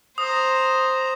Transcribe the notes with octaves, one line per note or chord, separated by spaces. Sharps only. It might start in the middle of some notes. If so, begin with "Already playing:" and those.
C5 A#5 D#6